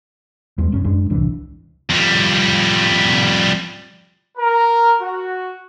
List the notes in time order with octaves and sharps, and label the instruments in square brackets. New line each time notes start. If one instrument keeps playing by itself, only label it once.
[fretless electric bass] E2 G2 G#3
F#1 G2 C#4
F#2 G#3 D4
D1 C2 E3 D4
[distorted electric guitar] F2 G3
[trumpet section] A#4
F#4